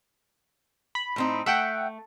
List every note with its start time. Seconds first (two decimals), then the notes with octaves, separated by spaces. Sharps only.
0.95 B5
1.16 A2 C4 D#4
1.46 A3 E5 F#5 G5